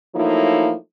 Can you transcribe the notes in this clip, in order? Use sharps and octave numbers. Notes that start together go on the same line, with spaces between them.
F3 F#3 A3 A#3 D#4 E4